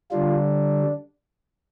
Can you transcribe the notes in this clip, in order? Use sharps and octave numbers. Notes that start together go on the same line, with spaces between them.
D3 G3 D4 F4